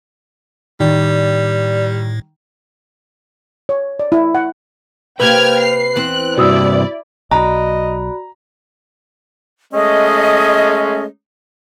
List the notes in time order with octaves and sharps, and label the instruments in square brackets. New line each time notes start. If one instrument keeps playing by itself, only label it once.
[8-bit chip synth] A2 [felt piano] D#3 [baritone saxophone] G3 [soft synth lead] D5
[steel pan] C#5
D5
E4
F#5
[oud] C3 A#3 G4 [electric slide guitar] B4 [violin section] G5 F6 G#6
[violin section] C7
[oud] E2 E3 C4 [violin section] F#6
[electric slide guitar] G2 C3 [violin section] E4 D5 [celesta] F#4 D#6 E6
[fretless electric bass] B1 [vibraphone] F#4 D5 B5 [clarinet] D#5 [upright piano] A#5
[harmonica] G#3 A3 C#4 [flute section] D#5